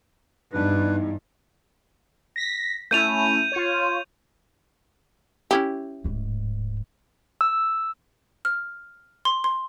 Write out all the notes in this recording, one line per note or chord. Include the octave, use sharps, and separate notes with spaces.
G2 E3 B3 D4 D#4 B4
A#6 B6
A3 C#4 E4 G6 D#7 F7
F4 C#5
C#4 E4 G4
D1 G#2
E6
F6
C6
C6